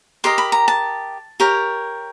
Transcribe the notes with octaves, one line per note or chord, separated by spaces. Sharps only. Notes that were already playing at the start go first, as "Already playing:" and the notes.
G4 A#4 D#5 C6
B5
A#5
A5
G4 A#4 C#5